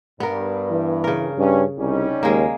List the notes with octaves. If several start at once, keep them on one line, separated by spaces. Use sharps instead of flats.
G2 B3 A#4
E3
C#3 A#4
G2 C#4
C2 G3 C#4 D#4
D#2 G#3 A#3